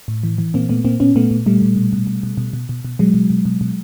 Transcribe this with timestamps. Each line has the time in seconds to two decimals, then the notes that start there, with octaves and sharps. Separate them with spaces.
0.08 A2
0.23 E3
0.38 E3
0.54 A#2 A#3 C4
0.69 A#2 A3 B3
0.85 A#2 A#3 C4
1.00 A#2 B3 C#4
1.15 A#2 A3 B3
1.31 A#2
1.46 A#2 G3 A3
1.62 A#2
1.76 B2
1.93 B2
2.07 B2
2.23 B2
2.37 B2
2.53 B2
2.69 B2
2.85 B2
2.99 B2 F#3 G#3
3.14 B2
3.30 B2
3.45 B2
3.61 B2